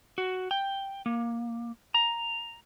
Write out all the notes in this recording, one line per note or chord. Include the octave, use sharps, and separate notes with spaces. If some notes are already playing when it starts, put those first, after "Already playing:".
F#4
G5
A#3
A#5